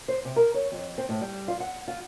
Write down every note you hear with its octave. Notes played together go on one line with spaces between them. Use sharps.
C5
C3
A#4
C#5
F2
C4
A2
G3
F4
F#5
F4